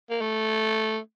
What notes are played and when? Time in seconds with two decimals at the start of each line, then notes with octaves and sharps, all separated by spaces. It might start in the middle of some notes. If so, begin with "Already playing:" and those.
0.10 A#3
0.21 A3